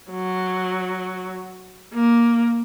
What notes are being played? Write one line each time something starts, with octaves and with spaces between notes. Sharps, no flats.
F#3
A#3